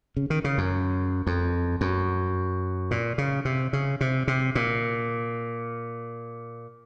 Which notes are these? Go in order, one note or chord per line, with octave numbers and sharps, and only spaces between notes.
C#3
D#3
C#3
F#2
F2
F#2
A#2
C#3
C3
C#3
C3
C3
A#2